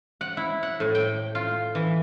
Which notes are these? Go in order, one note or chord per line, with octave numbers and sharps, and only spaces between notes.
F#5
E4
F#5
A2
G5
F4
E3